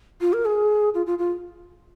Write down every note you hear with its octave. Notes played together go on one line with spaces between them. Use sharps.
F4
A#4
G#4
F4
F4
F4